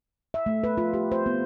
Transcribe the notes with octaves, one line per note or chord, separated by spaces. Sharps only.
E5
A3
B4
F4
G4
C5
B3